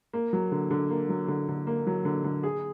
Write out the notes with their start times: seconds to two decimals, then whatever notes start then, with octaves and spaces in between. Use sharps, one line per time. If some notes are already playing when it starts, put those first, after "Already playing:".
0.13 A#3
0.33 F#3
0.52 D3
0.71 D3
0.90 A#3
1.09 F#3
1.28 D3
1.49 D3
1.67 A#3
1.87 F#3
2.05 D3
2.24 D3
2.43 G#4